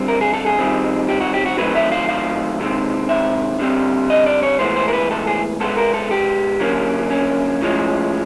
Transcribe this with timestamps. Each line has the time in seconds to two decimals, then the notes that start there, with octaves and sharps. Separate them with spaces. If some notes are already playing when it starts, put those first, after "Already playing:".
Already playing: D3 G3 C4
0.08 A#4
0.21 G#4
0.33 A4
0.46 G#4
0.59 D#3 G3 C4
1.09 G4
1.21 F#4
1.34 G4
1.46 F#4
1.58 D#3 F#3 A3 C4 B4
1.75 E5
1.92 F5
2.09 F5
2.60 C3 D#3 G#3 C4
3.09 E5
3.59 D3 G3 C4
4.10 D#5
4.26 D5
4.43 C#5
4.59 A2 E3 G#3 B3 C5
4.76 C5
4.88 A#4
4.93 B4
5.11 A4
5.27 G#4
5.60 B2 G#3 B3 A4
5.77 A#4
5.94 A4
6.11 G4
6.60 D3 F#3 A#3 C#4
7.10 C#4
7.61 A2 F3 G#3 C#4